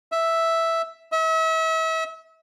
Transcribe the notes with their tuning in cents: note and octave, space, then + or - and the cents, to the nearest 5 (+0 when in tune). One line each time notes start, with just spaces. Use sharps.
E5 +0
E5 -35